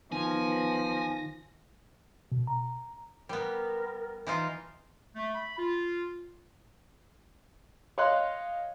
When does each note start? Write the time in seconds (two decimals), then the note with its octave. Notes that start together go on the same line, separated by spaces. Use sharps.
0.12 D#3 F3 B3 G#5 A#6
2.32 B2
2.47 A#5
3.29 G3 B3 A#4
4.27 E3 D#4 F4
5.16 A3
5.35 B5
5.58 F4
7.98 C#5 D#5 F5 C6 F#6